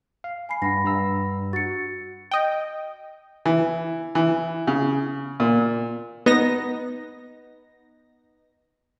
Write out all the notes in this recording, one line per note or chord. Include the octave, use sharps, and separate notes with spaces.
F5
G#5 B5 C7
G2 F#5 B5 A#6
G2 A#5 E6
F#4 A6 C#7
D#5 G5
E3
E3
C#3
A#2
B3 D#4 A#6